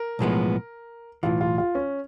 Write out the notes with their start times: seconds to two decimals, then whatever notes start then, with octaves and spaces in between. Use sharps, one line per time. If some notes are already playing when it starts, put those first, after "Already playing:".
Already playing: A#4
0.19 B1 A2 F3 G#3 B3
1.23 B1 A2 E3 F4
1.41 F4
1.58 F4
1.75 C#4